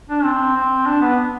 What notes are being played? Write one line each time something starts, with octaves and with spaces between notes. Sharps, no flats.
D4
C4
C4
D4
B3